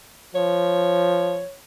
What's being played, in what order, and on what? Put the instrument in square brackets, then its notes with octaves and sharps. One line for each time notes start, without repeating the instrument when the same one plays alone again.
[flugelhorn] F3 [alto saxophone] C#5